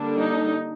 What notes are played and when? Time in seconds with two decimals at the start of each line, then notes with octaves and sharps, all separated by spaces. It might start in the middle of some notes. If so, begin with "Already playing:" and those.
Already playing: D3 G3 A#3 D4
0.18 D#4